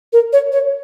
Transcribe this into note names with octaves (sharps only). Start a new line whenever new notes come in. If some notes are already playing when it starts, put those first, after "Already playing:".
A#4
C#5
C#5